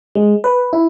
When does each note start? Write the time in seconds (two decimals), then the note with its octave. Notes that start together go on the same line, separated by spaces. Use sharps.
0.15 G#3
0.44 B4
0.73 E4